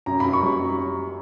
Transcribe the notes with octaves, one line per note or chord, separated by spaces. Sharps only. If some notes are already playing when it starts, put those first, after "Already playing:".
F#2 A#5
F#2 B5
C#6
G3